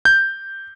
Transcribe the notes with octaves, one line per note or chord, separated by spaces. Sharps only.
G6